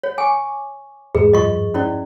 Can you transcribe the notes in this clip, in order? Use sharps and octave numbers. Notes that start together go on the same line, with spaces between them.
C#5
G#5 C#6 D6
E2 G#2 G#4 B4
G2 F3 D#5 C#6
C#4 E4 D5